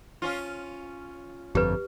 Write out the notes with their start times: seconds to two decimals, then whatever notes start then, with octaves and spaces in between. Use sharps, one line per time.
0.22 C#4 F4
1.55 G1 F2 G4 B4